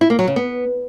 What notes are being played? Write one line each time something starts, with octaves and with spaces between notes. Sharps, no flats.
E4
A#3
F#3
C#3
B3